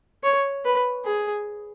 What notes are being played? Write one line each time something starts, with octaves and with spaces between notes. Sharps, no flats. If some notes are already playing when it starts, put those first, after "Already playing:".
C#5
B4
G#4